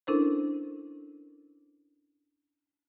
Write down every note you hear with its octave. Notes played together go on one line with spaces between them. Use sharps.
C#4 D4 E4 A4 A#4 C5